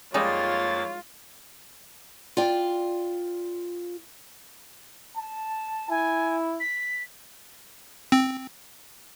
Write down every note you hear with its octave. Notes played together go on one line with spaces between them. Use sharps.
F2 G3 G#3 A#3 D#4 F4 C#5 A6
F4 D5 G5
A5
E4 G#5
B6
C4